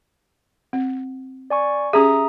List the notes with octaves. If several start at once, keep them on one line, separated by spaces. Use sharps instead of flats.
C4
D5 G#5 C#6
C#4 G4 G#4 E5 A#5 D#6